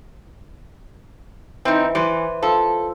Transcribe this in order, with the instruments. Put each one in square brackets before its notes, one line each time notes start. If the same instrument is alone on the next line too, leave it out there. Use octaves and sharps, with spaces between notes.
[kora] E3 [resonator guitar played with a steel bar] C4 D#4
[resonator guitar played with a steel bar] E3 [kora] B4 C5 D5
[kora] F3 [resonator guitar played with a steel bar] A4